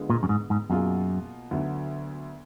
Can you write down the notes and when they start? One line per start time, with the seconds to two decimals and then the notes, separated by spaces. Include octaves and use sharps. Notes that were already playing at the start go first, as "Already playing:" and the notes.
Already playing: D3 G#3 B3 F4
0.10 A#2
0.23 F#2
0.29 G#2
0.50 G#2
0.70 F#2 B2 A#3 F4 G#4
1.51 D2 D3 F#3 B3 D4